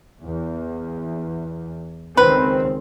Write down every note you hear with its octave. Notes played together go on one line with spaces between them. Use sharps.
E2
C#2 D#3 C4 B4